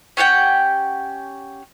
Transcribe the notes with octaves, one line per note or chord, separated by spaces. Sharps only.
C#4 G4 F#5 G5